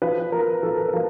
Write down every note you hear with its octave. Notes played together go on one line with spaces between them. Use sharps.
F3 B4
F3 A#4
F3 A4
A#4
F3 A4